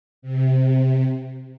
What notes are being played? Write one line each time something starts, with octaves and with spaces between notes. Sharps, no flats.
C3